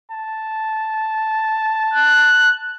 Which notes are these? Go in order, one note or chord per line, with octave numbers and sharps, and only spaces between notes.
A5
F#6